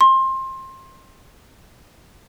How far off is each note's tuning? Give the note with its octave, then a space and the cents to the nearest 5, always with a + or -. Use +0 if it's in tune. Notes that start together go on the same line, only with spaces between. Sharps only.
C6 +20